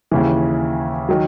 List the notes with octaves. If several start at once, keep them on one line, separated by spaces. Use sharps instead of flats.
D#2 C#3 E3
D#3 F#3